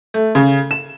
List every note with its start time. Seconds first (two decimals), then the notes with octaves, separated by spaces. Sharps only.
0.14 A3
0.35 C#3
0.71 E7